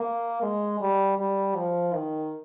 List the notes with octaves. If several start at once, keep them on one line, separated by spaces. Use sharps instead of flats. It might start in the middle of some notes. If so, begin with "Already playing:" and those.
Already playing: A#3
G#3
G3
G3
F3
D#3